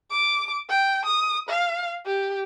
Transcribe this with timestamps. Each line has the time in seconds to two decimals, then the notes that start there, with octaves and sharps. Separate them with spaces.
0.10 D6
0.69 G5
1.05 D#6
1.49 F5
2.06 G4